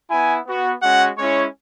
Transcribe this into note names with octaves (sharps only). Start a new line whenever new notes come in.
B3 E4 G#5
B3 F#4
G#3 C#4 F#4 F#5
G#3 C#4 E4 C#5